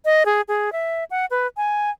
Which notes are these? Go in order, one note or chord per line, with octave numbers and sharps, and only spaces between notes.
D#5
G#4
G#4
E5
F#5
B4
G#5